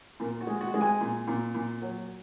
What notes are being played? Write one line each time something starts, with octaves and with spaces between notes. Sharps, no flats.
A#2 A#4
F#4
G#3
F#4
G#3
G#5
A#2
A#2
A#2
F#3